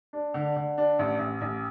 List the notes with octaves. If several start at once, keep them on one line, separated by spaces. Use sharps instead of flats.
D4
D3
D3
D4
A1
A1
A1